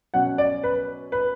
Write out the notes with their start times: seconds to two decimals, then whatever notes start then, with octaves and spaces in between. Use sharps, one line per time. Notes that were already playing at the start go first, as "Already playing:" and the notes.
0.14 B2 F#3 C#4 F#5
0.38 D5
0.64 B4
1.12 B4